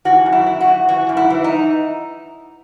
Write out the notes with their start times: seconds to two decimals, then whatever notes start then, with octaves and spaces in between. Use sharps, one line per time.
0.05 E3 F#4
0.26 F#2
0.32 E4
0.46 E3
0.60 F#4
0.68 F#2
0.89 E3 F#4
1.09 F#2
1.17 E4
1.30 E3
1.44 D#4